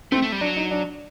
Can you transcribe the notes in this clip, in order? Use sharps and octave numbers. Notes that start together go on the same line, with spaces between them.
A3 C4
A3
G3
F#3 D4
D#4
D4